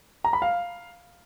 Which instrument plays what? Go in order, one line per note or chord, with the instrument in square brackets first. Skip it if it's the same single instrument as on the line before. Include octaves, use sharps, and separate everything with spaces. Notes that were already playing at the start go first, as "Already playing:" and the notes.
[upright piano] A#5
B5
F5